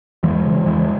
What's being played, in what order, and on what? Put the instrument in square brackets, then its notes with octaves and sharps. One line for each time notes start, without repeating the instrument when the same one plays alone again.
[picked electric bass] E2 E3 G#3
C#3
E2 E3 G#3